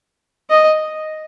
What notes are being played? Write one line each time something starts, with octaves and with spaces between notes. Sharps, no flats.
D#5